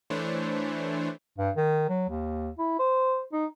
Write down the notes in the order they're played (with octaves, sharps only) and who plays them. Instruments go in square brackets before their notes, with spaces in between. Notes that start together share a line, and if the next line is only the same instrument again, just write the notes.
[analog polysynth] E3 A3 D4 C5 C#5
[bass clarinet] G2
D#3
F#3
D#2
E4
C5
D#4